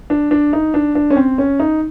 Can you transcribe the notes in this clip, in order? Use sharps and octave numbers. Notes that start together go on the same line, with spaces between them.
D4
D4
D#4
D4
D4
C#4
C4
C#4
D#4